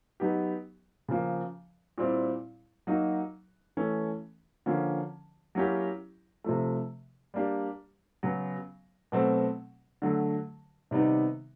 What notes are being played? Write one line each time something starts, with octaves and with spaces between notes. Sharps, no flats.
F#3 B3 D#4 G4
C#3 F3 A#3
A#2 G3 C4 E4
F#3 A#3 D#4 F#4
E3 A3 C#4
D3 F3 A#3 C#4
F#3 A#3 C#4 E4 G4
C3 F3 A3
G3 A#3 D4 G4
C#3 F#3 B3
B2 F#3 A3 C4
D3 F#3 A3
C3 D#3 G3 B3 D#4